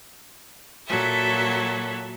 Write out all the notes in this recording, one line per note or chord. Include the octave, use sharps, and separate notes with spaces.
A#2 F#3 A4 E5